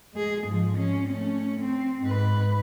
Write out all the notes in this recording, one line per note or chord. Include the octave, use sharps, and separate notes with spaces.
G#3 G#4
G#2 F3
C#4
A3 C#4
C4
G#2 B4